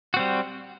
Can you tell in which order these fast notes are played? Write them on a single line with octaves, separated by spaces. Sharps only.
F#4 C4 G3